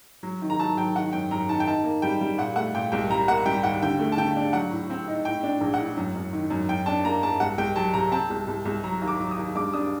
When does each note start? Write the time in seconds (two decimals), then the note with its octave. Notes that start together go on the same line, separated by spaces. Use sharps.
0.23 F#3
0.42 D#3
0.50 A#5
0.59 F#3 A5
0.77 F#3 G5
0.96 D#3 F#5
1.12 F#2 G5
1.31 F#2 A#5
1.48 D#3 A5
1.60 G5
1.67 D#4 A5
1.84 A#3
2.02 G3 G5
2.21 G3
2.38 A#2 F#5
2.56 A3 F#5
2.74 A#2 G5
2.92 C2 G5
3.10 G3 A#5
3.28 A#3 F#5
3.46 G3 G5
3.63 D#2 F#5
3.83 D3 G5
3.99 A3
4.12 A5
4.17 D3 G5
4.36 D4
4.53 F#3 F#5
4.71 A2
4.90 C4
5.07 D#4
5.25 A2 G5
5.43 D4
5.50 G5
5.61 A#1
5.74 F#5
5.79 A2
5.97 F#2
6.15 F#2
6.33 D#3
6.50 F#2
6.69 F#2 G5
6.86 D4 A5
7.04 A#3 A#5
7.22 A#3 A5
7.40 C2 F#5
7.58 C2 G5
7.76 F#3 A5
7.94 C3 A#5
8.11 C4 A5
8.30 C2
8.47 C2
8.65 C2
8.84 F#3 A#5
9.02 D#2
9.08 D6
9.20 F#3
9.31 D#6
9.37 D#2
9.55 G2 D6
9.73 D4 D#6